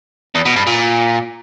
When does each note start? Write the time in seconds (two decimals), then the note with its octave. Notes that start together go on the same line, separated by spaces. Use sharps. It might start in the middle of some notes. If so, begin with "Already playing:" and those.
0.35 E2
0.45 B2
0.56 G2
0.67 A#2